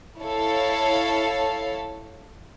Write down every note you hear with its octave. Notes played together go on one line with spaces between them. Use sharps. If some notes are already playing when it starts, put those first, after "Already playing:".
E4 A4 C#5 F5